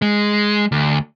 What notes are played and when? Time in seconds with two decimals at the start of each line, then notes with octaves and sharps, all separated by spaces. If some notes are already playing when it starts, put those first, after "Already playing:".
0.02 G#3
0.72 D2